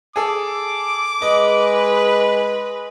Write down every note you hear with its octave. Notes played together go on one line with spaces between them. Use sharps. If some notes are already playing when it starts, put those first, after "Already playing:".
G#4 A4 D6
G#3 B4 D#5